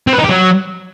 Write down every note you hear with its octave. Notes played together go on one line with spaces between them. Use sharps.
C4
B4
D#4
G4
F#3